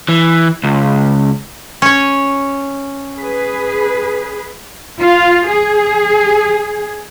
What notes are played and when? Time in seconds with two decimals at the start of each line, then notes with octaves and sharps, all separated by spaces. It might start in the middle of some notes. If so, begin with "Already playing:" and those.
0.08 E3
0.64 C#2
1.82 C#4 C#5
3.17 G#4 B4
5.01 F4
5.48 G#4